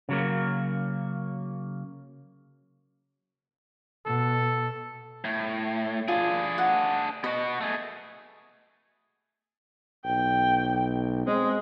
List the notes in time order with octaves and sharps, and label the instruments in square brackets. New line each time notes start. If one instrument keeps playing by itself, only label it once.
[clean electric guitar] C#3 F#3 A#3
[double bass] B2 [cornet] A4
[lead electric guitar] A2
[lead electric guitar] D4 G#4 [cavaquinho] F4
[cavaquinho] F#5
[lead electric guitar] B3 F#4 [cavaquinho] D#5
[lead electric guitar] A3 G#4
[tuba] B1 [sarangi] G5
[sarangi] G#3 [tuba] C4